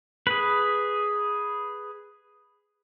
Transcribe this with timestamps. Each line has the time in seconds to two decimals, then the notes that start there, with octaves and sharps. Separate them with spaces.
0.27 G#4 B4